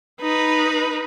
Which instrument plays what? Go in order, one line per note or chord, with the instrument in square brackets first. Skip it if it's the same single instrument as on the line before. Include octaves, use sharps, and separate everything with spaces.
[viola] D#4 B4